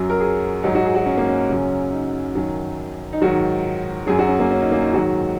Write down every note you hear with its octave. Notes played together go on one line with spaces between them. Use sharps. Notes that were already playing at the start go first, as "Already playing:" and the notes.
Already playing: F#2 F#3 F#4
A#4
G#4
G#2 F#3 D#4
F#4
G#4
F#4
C#4
A#3
C#4
F#2 C#3 F#3
D#4
F#2 D#3 F#3
D#4
G#2 D#3 F#3 F#4
F#2 F#3 G#4
F#4
C#4
A#3
C#4
D#4
A#3
D#4
G#2 D#3 F#3 F#4